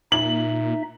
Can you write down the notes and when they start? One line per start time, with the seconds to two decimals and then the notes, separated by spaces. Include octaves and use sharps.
0.12 A#2 D#4 E5 F#7